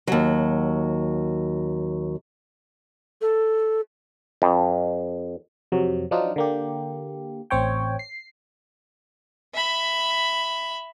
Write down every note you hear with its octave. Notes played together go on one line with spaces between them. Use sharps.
D#2 F#3
A4
F2
F2 C3 F#3
F3 F#3 D4 D#4 F4
D3 A#3 G4
A1 C4 C#5 G5
C7
E5 B5